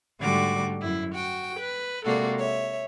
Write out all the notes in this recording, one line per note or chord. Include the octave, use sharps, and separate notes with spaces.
G#2 D3 G3 A3 F#4 D6
F#2 E4
F#4 G5
B4
C3 G#3 A#3 F#4 A4 D5
C#5 E5